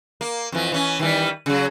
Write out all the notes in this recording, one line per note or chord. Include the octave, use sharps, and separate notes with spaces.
A#3
F2 E3
E3 C#4
D#3 E3 G3
C#3 F#3